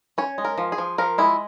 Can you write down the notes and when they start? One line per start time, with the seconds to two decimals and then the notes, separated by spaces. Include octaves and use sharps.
0.18 C#4 C#5
0.38 G#3
0.45 A#4
0.58 F3
0.72 G#4
0.78 F3
0.98 F3 A#4
1.18 G#3 E4